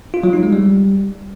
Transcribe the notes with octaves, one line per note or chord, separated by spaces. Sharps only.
F4
F#3
D#4
G#3
G3